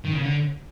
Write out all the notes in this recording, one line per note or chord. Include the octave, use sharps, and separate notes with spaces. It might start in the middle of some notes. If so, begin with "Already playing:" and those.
D#3
C#3
D3